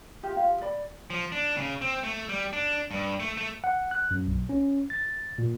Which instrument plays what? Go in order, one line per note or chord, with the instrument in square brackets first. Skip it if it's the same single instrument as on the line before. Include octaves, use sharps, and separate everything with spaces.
[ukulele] F4 G4 E5
F4 G4 F5
D5 B5
[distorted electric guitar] F3
D4
C#3
C4
A3
G3
D4
G2
A3
A3
[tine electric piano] F#5
F#6
F#2
B1
C#4
A6
A#2